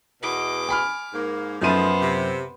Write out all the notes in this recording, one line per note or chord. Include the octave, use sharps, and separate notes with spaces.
E2 B2 D#5 D6
G#5 B5 F6
G#2 A#3
F#2 F3 A3 B3 D#4 F4 C5 D#7
C3